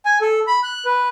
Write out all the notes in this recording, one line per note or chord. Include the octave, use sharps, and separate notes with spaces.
G#5
A4
B5
F#6
B4